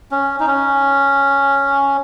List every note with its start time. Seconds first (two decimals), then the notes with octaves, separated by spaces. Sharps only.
0.11 C#4
0.40 D#4
0.47 C#4